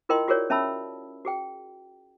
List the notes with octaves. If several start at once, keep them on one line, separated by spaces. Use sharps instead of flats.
E4 F4 A#4 D#5 G5 C6
F4 F#4 G#4 A#4 C#5 D5
C#4 E5 A5 B5 E6
F#4 G#4 G5